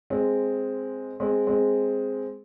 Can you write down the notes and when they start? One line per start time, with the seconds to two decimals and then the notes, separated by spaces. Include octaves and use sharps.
0.10 G#3 C4
1.20 G#3 C4
1.47 G#3 C4